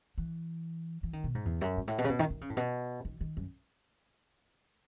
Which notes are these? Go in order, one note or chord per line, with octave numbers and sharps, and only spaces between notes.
E3
E3
D#3
B2
G#2
E2
F#2
G#2
A2
B2
C#3
B2
D#3
D#3
C#3
A2
B2
D#3
D#3
F#2